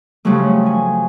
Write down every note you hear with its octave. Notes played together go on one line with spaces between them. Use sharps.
G2 C#3 F3 F#3 A3
G#5